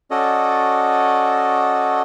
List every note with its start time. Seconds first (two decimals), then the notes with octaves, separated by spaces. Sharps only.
0.11 C#4 F#4 A4 D5 D#5